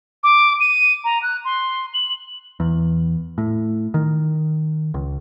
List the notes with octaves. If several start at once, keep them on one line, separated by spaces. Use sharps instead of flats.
D6
D#7
A#5
F#6
C6
F#7
E2
A2
D#3
C#2